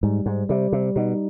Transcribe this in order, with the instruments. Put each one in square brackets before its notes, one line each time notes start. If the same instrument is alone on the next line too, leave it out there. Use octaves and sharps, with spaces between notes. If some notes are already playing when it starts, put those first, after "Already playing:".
[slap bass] G#2 [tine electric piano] G3
[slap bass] G#2
[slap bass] C3 [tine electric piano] G3
[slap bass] C3
[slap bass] B2 [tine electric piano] D#4